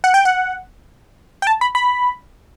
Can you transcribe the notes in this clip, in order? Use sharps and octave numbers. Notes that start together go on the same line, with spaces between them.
F#5
G5
F#5
G5
A5
B5
B5